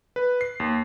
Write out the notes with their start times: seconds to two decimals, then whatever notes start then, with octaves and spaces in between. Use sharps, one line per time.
0.16 B4
0.41 C7
0.60 D#2